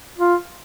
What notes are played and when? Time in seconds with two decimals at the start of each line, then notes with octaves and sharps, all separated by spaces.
0.18 F4